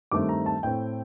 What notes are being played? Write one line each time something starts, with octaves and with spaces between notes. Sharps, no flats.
G2 D#3 A3 C4 D6
A#5
A5
A2 A3 C4 G5